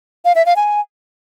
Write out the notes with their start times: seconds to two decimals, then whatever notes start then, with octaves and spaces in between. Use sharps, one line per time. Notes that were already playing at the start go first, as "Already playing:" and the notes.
0.25 F5
0.35 E5
0.46 F5
0.56 G#5